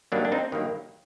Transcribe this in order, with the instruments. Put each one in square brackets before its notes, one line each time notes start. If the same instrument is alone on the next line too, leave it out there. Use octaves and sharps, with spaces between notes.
[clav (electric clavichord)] G2 D#3 F#3 A#3 D4
D4
C4 D#4
G2 D#3 F#3 A#3